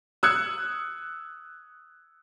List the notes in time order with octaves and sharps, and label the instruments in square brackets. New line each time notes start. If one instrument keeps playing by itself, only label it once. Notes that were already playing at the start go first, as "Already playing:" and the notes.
[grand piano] D#6 E6 F#6 G#6 C#7